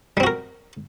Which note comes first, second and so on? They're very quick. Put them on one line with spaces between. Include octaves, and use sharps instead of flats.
G3 C4 F#4 A#4